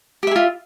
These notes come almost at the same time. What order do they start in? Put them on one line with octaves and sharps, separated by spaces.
G4 E5 G#4 F4